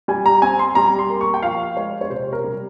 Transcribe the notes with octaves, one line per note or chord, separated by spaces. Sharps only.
G3 G#5
A#5
C4 G#5
C6
G3 A#5
C6
A#3
C#6
G5
F3 F5
G#3 C#5
C#5
C3 C5
A#4
G3